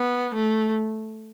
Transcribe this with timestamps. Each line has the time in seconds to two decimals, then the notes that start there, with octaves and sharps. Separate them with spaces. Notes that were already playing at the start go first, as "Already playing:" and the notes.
Already playing: B3
0.34 A3